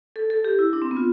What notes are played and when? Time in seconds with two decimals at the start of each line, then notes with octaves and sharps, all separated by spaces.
0.16 A4
0.30 A4
0.44 G4
0.59 E4
0.73 D4
0.82 C4
0.91 B3
0.97 F4